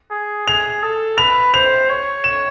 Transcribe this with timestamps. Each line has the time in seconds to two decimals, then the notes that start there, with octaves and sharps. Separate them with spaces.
0.11 G#4
0.48 G#4 F7
0.83 A4
1.18 B4 F7
1.54 C5 F7
1.89 C#5
2.24 E7